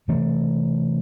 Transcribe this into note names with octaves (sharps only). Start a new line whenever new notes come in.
C3 E3 A3 C4